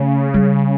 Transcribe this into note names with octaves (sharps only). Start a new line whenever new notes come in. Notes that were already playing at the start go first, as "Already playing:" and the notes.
Already playing: C#3 A3
G3